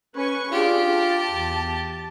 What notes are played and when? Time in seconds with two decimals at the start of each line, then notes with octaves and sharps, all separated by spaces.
0.17 C#4 B4 G#5 C#6
0.52 D4 F4 G4 G#4
0.91 A5
1.30 E2